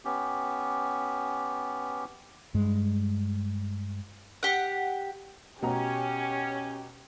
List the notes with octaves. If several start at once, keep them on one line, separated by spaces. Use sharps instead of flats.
B3 C#4 G4
G2 G#3
G4 F#5
B2 C#4 G4 A#5